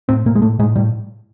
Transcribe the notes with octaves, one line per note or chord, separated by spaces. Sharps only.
A2 C4
A2 A#3
G#3
A2 A3
A2 G#3
A2 G3